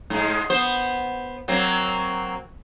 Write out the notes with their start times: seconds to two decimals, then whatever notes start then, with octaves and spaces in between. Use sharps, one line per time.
0.10 G#2 G#3
0.50 B3 C5
1.48 F#3 A#3 C4